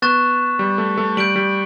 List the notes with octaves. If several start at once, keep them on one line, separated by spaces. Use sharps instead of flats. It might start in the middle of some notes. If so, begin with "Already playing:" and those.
B3 C#6 F#6 A6 E7
G3
A3
A3
G3 G6 D7 F#7
G3